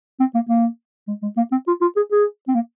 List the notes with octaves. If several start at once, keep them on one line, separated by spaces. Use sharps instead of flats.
C4
A#3
A#3
G#3
G#3
A#3
C4
F4
F4
G#4
G#4
C4
A#3